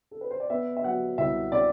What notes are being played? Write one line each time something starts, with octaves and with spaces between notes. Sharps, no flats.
A4
B4
C5
D5
B3 E5
E5
F#3 F#5
C2 E5
C3 D5